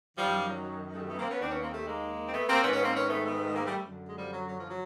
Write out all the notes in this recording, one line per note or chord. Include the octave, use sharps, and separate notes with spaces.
F#2 D#3 F3 G3
F#3
F#3
G3 A3
A3 B3
A#3 C4
B3 C#4
D#2 D#3 C4 D4
B3 C#4
A#3 C4
G3 A3
G#3 A#3
C4
A3 B3
A#3 C4
G#2 D#3 B3 C#4
B3 C#4
A#3 C4
B3 C#4
A3 B3
A3 B3
G#3 A#3
G3 A3
F#2 D3
G#3
F3 G3
F#3
F#3
F3
F#3